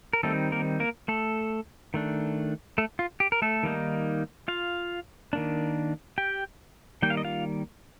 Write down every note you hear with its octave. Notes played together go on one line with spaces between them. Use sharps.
A#4
D#3 G3 A3 C4 D#4 A4
A#3 A#4
A#3 A#4
A3 A4
D#3 A3 D4
A3 A4
F4
G4
A#4
A3 A4
D#3 G3 A#3 D#4
F4 F5
D#3 A#3 D4
G4 G5
D#3 G3 A#3 G5
F5
D#5
F4 F5